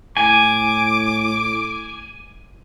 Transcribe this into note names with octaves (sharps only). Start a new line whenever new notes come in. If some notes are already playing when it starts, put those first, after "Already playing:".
A2 G#5 D6